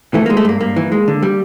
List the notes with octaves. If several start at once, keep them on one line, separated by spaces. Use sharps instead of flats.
E3 A3
G#3 A#3
A3
G2 A#3
G2 A#3
E3
G#3
D3
G3